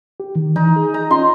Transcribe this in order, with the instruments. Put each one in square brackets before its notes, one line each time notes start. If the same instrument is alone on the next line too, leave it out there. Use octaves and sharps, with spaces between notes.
[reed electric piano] G4
D#3
[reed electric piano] E3 [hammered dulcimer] D#4
[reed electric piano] G#4
[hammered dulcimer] A#5
[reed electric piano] C#4 F4 D#5 [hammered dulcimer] C6